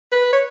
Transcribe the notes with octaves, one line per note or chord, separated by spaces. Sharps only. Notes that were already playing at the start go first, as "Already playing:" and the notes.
B4
C#5